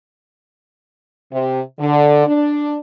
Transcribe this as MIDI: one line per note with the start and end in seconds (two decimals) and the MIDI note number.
1.33 1.61 48
1.80 2.24 50
2.27 2.76 62